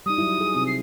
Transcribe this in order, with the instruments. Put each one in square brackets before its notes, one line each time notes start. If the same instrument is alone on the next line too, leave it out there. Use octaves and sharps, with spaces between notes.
[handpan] G3 D#4 [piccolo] D#6
[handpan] F#3 G3 E4
G3 G#4
C3 C4
[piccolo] C7